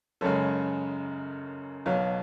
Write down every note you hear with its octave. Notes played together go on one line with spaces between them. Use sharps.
F#1 F#2 C#3 G#3 A4 C#5
B1 B2 F#3 C#5 F5